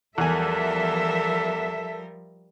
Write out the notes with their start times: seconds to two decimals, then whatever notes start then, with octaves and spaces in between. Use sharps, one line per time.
0.18 E2 F3 G3 A4 A#4 E5 G#5